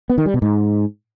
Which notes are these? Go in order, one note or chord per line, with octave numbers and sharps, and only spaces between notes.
B3
D#3
G3
B2
G#2